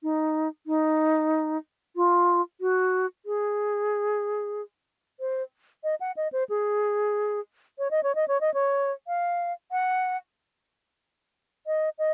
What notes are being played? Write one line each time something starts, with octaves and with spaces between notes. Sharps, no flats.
D#4
D#4
F4
F#4
G#4
C5
D#5
F#5
D#5
C5
G#4
C#5
D#5
C#5
D#5
C#5
D#5
C#5
F5
F#5
D#5
D#5